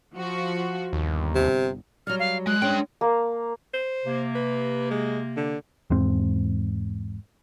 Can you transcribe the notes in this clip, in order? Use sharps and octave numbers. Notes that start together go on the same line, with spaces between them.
F3 F#4
G1 D#2
C3
F#3 G3 F6
F5
G#3 F#6
G#3 C#4 D4 C5 G5
A#3
C5
C3 A#3
B4
G#3
D3
E2 G#2 C4